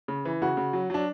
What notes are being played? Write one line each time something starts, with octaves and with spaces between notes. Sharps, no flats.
C#3
E3
C#3 F#4
C#3
F#3
F#3 D4